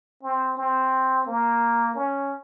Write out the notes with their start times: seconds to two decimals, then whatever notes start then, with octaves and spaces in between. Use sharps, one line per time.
0.23 C4
0.58 C4
1.27 A#3
1.96 C#4